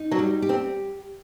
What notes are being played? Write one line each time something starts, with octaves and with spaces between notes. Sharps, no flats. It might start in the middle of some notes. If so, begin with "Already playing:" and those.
Already playing: D#4
F#3
G3
G4
C4